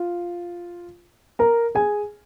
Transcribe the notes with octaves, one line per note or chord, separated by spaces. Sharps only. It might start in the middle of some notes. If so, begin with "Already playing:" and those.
Already playing: F4
A#4 A#5
G#4 G#5